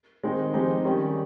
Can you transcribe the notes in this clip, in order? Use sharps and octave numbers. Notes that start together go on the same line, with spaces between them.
D#3 G#3 C4 D#4
F3 G#3 C4 D#4 G4
D#3 G3 C#4